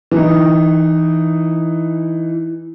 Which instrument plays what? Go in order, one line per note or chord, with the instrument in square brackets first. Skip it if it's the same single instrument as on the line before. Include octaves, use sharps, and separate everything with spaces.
[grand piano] E3 D#4